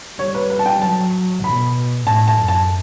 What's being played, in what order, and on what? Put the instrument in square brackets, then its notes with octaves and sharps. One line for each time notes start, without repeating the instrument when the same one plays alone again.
[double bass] G3 [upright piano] C#5
[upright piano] B4
B4
A5
G5
[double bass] F#3 [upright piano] A5
[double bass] B2 [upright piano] B5
[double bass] A2 [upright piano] A5
[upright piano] A5
[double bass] F#2
[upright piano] A5